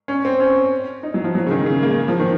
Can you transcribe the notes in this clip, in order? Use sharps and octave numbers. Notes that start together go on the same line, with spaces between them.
C#4
C4
C#4
D#4
F#3
F3
F#3
C#3
D#3
C#3
A#3
F3
D#3